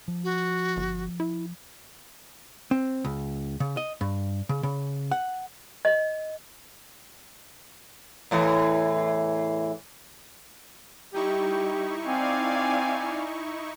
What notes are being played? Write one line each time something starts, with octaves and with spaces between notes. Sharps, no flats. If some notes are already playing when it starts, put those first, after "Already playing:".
F3
F#4
G1
E4
C4
C#2
C#3
D#5
G2
C#3
C#3
F#5
D#5
E2 A2 E3
G3 D#4 E4 G4 C#6
C4 D5 F5 G#5